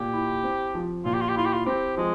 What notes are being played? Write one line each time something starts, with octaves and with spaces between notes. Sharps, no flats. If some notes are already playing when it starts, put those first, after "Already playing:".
Already playing: A#2 G4
E4
C4
F3
A#2 F4
G4
F4
G4
E4 F4
G4
F4
C4 G4
F3 G#3